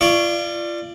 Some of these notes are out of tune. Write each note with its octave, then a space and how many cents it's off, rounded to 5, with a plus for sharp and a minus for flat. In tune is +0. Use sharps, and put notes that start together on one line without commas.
F4 -30 D5 +15 C#6 +0